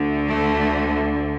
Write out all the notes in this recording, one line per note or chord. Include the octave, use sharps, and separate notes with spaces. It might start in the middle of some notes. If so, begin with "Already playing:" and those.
Already playing: D2 D3
A3